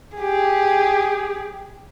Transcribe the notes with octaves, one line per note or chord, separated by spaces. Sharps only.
G4 G#4